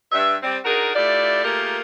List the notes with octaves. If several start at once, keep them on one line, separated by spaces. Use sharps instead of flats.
G2 E5
G3 C4
D4 D#4 F#4 G#4 A#4
A3 E4 F4 G4 D5
A3 A#3 F4 G4 G#4 A#4